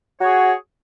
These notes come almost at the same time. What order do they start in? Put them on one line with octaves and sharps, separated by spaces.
F#4 C#5 G#4